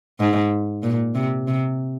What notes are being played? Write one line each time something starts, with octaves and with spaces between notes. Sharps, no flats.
G#2
A#2
C3
C3